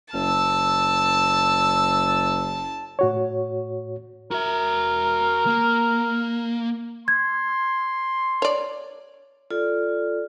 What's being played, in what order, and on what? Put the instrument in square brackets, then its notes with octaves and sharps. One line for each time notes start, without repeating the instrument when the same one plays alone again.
[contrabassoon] F#1 [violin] A5 [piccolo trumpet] E6
[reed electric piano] A2 F#4 C#5
[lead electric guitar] F#4 E5 [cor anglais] A#4
[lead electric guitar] A#3
[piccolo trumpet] C6 [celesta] G#6
[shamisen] C#5 D5
[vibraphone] F4 A4 D5